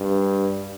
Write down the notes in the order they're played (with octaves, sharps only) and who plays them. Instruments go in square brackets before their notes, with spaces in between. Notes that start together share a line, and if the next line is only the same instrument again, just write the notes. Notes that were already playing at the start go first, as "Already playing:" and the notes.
Already playing: [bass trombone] G2